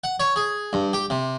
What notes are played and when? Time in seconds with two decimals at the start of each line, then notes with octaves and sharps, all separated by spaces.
0.04 F#5
0.20 C#5
0.36 G#4
0.73 G2
0.93 G4
1.10 C3